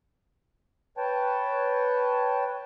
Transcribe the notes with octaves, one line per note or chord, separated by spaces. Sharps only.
B4 C#5 G5 A5